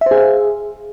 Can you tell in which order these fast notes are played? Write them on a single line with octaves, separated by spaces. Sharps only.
E5 C5 G#4 F5